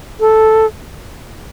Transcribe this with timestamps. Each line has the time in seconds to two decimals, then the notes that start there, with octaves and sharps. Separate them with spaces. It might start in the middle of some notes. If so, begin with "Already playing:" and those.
0.20 A4